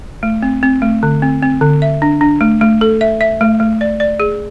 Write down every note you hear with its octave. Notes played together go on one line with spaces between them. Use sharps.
A3
C4
C4
A3
D3
C4
C4
D3
E5
D4
D4
A3
A3
A4
E5
E5
A3
A3
D5
D5
G#4